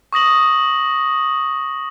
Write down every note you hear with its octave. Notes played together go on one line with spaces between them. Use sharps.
C#6 D#6 A#6 F#7